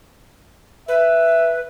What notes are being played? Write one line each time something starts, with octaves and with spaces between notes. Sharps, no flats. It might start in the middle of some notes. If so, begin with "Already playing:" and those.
B4 E5